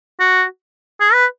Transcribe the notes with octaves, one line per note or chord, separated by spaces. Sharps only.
F#4
G#4
B4